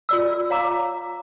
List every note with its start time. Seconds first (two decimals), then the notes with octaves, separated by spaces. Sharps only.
0.09 F4 D5 E6
0.50 C#5 F5 A#5 D6